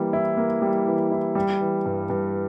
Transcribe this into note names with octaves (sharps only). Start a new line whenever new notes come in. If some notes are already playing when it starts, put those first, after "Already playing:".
Already playing: E3 G3 A#3
E4
A#3
G3
E3
E4
G3
E3
G2
G2